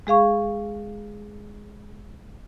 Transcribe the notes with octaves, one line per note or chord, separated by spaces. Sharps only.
G#3 G#4 F5 C#6